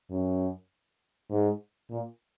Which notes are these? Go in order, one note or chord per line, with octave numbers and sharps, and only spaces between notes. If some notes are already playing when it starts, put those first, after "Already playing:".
F#2
G#2
A#2